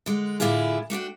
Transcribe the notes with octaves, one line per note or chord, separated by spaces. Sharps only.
D3 G#3
A2 D3 G3 E4 F4 G#4
A3 D4 F#4 G5